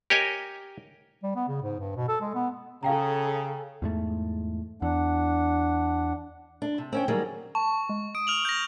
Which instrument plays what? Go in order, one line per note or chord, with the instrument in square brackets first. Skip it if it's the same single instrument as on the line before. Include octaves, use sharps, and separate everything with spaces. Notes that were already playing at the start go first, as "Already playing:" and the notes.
[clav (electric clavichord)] G4 A#4 C#5 D#5 G#5
[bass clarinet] G3
B3
C#3
G#2
G2
B2
A4
G#3
B3
[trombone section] C#3 [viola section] G#4 A4 [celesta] F5 G5 A#5
[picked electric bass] E2 G#2 A3
[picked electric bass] E2 [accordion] D4 F#5
[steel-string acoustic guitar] D4
C3
C4 C#4 G5
D#3 F#3 G3 A#3 G#4
[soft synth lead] A5 [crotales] C#6
[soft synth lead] G#3
[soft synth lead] D#6 [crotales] D7
[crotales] F6 F7 F#7
G6 A#6